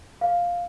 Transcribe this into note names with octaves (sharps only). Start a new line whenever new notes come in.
F5